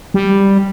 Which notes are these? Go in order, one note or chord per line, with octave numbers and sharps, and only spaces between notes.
G3